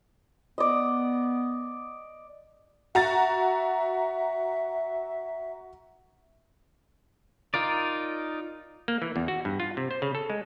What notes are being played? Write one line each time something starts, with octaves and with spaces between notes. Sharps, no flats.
B3 D5 D#5
F#4 E5 A#5 A6
D#4 F4 A#4 D5
A#3
E3
E2
F#4
G2
F4
C3
C5
C#3
A4
G#3